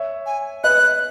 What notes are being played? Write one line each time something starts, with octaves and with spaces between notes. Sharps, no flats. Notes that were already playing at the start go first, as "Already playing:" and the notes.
Already playing: C#5 E5
G#5
B4 D#5 F#6